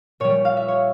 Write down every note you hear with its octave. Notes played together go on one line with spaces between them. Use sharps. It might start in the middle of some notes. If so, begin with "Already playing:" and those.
A#2 G3 C#5
F5
E5
C#5